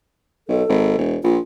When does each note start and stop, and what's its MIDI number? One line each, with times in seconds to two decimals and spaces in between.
0.48 0.63 35
0.48 0.98 69
0.69 0.95 32
0.98 1.17 28
1.23 1.37 34
1.23 1.40 65